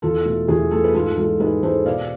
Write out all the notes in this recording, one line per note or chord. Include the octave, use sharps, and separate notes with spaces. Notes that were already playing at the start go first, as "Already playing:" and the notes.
E2 F4 A4
B2 A3
E2 E4 G#4
B2 A3 F4 A4
B4
G#2 F4 A4
E3 G#3 F4 A4
G#2 G#4 B4
E3 G#3 A4 C5
B2 D5 F5